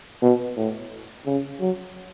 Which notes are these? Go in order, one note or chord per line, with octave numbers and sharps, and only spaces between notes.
B2
A2
C#3
F#3